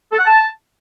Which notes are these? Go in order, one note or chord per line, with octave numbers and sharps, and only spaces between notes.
A4
F#5
A5